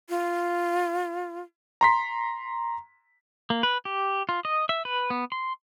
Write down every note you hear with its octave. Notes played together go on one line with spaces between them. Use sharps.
F4
A#5 C6 B6
A#3
B4
G4
F4
D#5
E5
B4
B3
C6